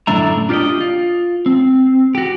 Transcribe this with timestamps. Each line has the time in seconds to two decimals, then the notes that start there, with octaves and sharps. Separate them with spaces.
0.07 F#2 A2 D3 D4 E5 A#5
0.49 D4 F4 G4 C5 D5 D#5
0.81 F4
1.46 C4
2.15 F#4 G4